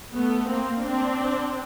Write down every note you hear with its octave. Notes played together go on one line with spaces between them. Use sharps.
A3 B3
A#3 C4
C4 D4